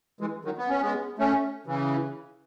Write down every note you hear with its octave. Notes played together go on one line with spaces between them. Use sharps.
E3 G#3
D#3 F#3
B3
C#4
G#3 B3
A3 C#4
C#3 E3